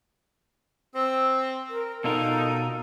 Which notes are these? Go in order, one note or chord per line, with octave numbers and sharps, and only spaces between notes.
C4 E6
A#4
B2 D#4 F4 A4 A#4